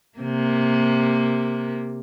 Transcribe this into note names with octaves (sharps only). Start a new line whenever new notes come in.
C3 A#3